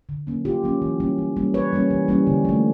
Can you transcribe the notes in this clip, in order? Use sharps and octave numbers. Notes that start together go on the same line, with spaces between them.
D3
F#3 A#3 C#4
D3 F4 G4
F#3 A#3 C#4
E3
G3 A#3 C#4
E3
G3 A#3 C#4
E3 B4 C#5
G3 A#3 C#4
E3
G3 A#3 C#4
D3
F3 A3